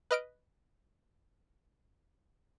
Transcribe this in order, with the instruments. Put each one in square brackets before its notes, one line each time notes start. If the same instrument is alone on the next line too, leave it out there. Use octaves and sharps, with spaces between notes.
[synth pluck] B4 D#5 F6 D7